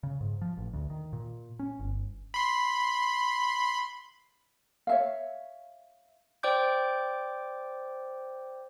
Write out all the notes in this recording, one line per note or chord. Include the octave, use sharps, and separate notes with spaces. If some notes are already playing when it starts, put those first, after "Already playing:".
C#3
G#2
F3
A1
D2
D#3
A#2
C#4
G1
B5 C6
C#5 E5 F5
C5 D5 G5 D6 G6